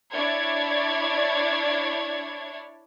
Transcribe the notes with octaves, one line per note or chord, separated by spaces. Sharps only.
D4 E4 C#5 D5 G#6